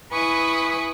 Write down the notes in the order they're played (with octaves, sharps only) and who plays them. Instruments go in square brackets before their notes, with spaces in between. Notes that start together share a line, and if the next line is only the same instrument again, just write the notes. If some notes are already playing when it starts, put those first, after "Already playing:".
[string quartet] E4 B4 G#5 B5 C#6 D#6